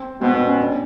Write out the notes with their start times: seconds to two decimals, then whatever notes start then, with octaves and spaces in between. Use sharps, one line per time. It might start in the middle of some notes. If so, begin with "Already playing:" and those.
Already playing: C4
0.21 B2 C4
0.34 C4
0.47 C#4
0.60 D4